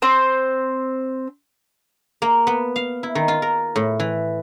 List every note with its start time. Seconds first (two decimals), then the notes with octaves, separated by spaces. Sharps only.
0.02 C4 C5
2.22 A#3
2.47 B3
2.76 F5
3.03 E4
3.15 D#3
3.28 F4
3.42 A#4
3.76 A2
4.00 E3